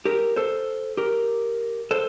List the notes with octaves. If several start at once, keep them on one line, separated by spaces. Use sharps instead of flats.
G4 A#4
A4 C5
G4 A#4
A4 C5